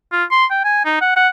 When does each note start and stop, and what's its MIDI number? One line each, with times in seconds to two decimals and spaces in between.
0.12 0.24 65
0.31 0.45 84
0.51 0.59 79
0.64 0.82 80
0.85 0.98 63
1.01 1.15 78
1.16 1.28 78